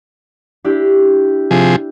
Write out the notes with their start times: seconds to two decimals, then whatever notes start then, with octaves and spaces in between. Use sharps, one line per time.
0.64 D4 E4 G4
1.51 C3 F3 G#4